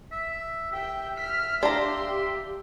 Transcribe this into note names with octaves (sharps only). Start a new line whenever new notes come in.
E5
G4 E5 G5
F6 B6
D4 G4 F5 A#5 C6